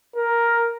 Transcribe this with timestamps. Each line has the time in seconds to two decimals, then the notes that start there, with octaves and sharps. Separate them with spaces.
0.16 A#4